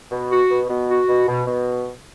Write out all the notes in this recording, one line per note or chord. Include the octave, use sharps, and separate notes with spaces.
B2
F#4
B2
B2
F#4
B2
B2
B2